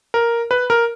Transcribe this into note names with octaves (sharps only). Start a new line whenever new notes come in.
A#4
B4
A#4